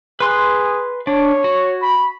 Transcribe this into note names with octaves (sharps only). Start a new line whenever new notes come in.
G#4 B4 C6 F#6
D4 C#5
F#4
B5